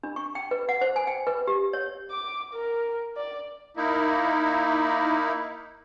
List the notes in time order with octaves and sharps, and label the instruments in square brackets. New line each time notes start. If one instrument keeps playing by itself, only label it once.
[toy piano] D4
C#6
G5
B4
F#5
C5
G#5
G5
B4
G4
C#5
[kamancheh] D6
A#4
D5
[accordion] A#3 D#4 E4